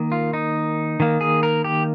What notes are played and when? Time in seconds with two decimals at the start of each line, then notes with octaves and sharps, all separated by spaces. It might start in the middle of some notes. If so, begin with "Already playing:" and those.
Already playing: D#3 A#3
0.12 F4
0.33 D#4
1.00 D#3 A#3
1.21 G#4
1.43 A#4
1.64 G4